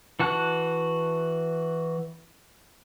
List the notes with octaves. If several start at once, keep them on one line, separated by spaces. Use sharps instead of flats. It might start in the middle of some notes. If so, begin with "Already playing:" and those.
E3 F#4 A5 F#6